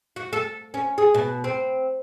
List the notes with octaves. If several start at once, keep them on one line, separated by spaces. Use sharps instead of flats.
F#4
A4
C#4
G#4
B2
C4